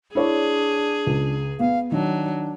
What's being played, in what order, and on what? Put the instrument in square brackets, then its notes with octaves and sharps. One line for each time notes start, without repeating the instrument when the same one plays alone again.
[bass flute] D4 [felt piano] E4 C#5 D5 [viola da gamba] G#4
[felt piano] C#2
[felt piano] B3 [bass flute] F5
[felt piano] D#3 [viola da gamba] F#3 [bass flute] D4